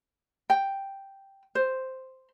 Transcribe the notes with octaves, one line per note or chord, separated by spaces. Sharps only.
G5
C5